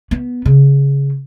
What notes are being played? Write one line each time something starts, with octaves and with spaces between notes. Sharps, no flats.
B3
C#3